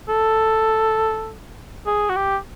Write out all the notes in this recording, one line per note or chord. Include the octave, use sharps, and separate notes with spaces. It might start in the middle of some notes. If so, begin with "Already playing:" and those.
A4
G#4
F#4
G4